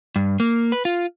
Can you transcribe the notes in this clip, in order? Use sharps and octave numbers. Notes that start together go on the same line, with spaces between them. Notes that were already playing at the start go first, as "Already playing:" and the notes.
G2
A#3
B4
F4